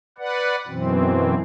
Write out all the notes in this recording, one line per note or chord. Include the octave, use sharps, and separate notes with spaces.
B4 D5 F#5
F#2 B2 E3 C4